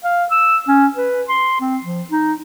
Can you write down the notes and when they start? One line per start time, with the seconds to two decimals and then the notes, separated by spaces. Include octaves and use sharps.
0.04 F5
0.31 E6
0.68 C#4
0.96 B4
1.29 C6
1.61 C4
1.84 F3
2.11 D#4